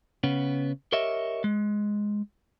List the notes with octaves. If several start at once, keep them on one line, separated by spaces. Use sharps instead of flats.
C#3 B3 C#4
G4 A#4 C#5 D#5 E5
G#3